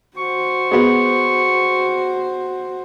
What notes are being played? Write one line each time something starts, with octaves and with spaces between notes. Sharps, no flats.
F#4 C5 C#6
G#3 B3